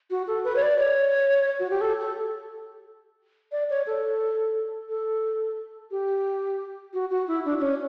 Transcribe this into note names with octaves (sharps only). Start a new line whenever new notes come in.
F#4
A4
B4
C#5
D5
C#5
F#4
G4
A4
A4
D5
C#5
A4
A4
G4
F#4
F#4
E4
D4
D4
C#4